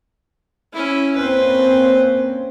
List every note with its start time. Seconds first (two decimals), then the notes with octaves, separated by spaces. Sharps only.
0.73 C#4 E4
1.16 A#3 C4 C#4 B4 C5